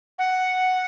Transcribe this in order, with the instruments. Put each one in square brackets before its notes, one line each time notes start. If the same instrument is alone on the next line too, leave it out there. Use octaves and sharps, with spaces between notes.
[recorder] F#5